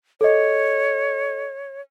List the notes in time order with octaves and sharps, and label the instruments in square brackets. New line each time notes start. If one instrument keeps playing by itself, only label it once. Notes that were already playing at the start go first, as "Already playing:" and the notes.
[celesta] A4 D#5 [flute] C#5